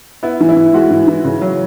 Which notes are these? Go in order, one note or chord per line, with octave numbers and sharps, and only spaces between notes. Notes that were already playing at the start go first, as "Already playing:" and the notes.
B3 E4
E3
E4
E3
G#3 F#4
E3
E3
C#3
F#3